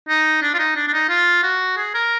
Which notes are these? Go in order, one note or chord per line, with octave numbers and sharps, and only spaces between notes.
D#4
D4
F4
D#4
D4
D4
D#4
F4
F#4
G#4
A#4